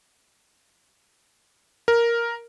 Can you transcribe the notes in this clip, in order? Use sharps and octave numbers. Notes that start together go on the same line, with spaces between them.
A#4